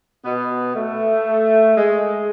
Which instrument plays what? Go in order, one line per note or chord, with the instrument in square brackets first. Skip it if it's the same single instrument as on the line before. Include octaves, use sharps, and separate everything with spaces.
[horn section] B2 B3
A3
G#3